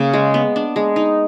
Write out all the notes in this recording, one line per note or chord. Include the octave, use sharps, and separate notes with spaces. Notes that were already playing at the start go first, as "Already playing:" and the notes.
Already playing: C#3 A#3
G#3
B3
D4
G#3
D#4